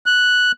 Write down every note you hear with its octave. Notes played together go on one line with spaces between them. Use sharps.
F#6